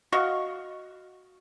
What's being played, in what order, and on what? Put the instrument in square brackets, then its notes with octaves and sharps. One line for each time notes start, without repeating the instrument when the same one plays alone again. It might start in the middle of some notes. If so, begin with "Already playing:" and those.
[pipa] F#4 D#5 F5 C#6